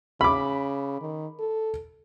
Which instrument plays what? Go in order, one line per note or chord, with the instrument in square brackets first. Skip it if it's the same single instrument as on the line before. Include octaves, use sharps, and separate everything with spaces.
[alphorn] C#3 [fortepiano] B5 D6
[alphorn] D#3
A4